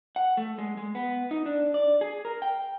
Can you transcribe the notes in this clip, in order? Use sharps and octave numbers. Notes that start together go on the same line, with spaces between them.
F#5
A3
G#3
G#3
B3
D#4
D4
D5
G#4
A#4
G5